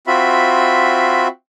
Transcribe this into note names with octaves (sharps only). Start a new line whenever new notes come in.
C4 F4 F#4 E5 B5